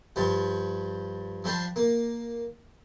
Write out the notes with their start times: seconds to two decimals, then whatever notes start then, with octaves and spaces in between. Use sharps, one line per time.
0.16 G2 F3 G3
1.44 F3 G3 D4 C5
1.76 A#3